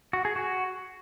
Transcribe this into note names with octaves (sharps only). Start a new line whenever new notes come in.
F#4
G#4
F#4